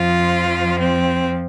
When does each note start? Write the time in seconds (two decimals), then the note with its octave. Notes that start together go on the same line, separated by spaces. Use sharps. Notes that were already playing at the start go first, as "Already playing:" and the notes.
Already playing: F2 F3 F4
0.80 C4